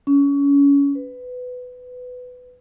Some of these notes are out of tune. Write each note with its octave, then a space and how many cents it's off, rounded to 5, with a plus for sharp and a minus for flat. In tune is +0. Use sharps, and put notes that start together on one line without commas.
C#4 +25
B4 +15